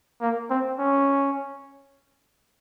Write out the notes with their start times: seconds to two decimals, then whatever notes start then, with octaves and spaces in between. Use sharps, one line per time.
0.21 A#3
0.50 C4
0.79 C#4